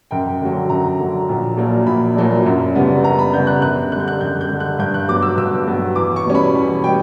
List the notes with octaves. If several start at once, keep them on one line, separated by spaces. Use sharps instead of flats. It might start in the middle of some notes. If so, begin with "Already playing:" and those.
F#2 G5
D3 F#3
F#2 A#5
D3 F#3
A#1
A#2 F#3 A#3 D4
A#1 B5
A#2 F#3 A#3 D4
F#2
C#3 G3 B3 D4
F#2 A#5
B5
C#3 G3 B3 D4 G6
F#6
F#2 F#6
D3 G3 F#6
G6
F#6
F#2 G6
G6
D3 G3
F#6
G2 G6
F#6
F#3 B3 D6
E6
G2 E6
F#3 B3
E2 D6
C#6
B2 G3 C#4
B5
E2 B5
B2 G3 G5